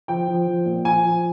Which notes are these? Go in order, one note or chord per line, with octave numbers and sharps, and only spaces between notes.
F3 G5
F3
F3
A#2
F3 G#5
F3